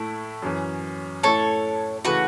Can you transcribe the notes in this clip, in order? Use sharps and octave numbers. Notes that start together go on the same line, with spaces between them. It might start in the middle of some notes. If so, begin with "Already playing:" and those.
Already playing: A2 A3 E4
F#2 E3 C#4
A2 A3 E4 A4 C#5
C#3 E3 A3 E4 F#4 B4